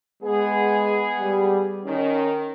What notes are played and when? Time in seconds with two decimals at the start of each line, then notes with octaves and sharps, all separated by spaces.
0.22 G#3 B3 G#4
1.19 G3
1.84 D#3 C#4